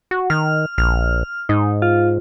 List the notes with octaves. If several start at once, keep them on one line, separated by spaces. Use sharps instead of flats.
F#4
D#3 F6
A#1 F6
G#2 D#4
F4